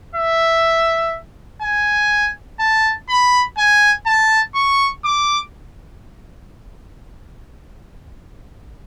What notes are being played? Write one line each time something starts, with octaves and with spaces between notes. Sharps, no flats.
E5
G#5
A5
B5
G#5
A5
C#6
D6